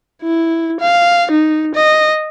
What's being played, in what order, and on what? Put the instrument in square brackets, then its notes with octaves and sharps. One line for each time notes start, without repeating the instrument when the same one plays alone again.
[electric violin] E4
F5
D#4
D#5